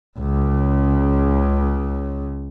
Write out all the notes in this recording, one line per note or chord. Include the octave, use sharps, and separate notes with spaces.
C#2 C#3